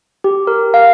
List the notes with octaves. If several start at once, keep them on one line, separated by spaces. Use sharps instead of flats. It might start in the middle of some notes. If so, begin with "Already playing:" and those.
G4
A#4
F5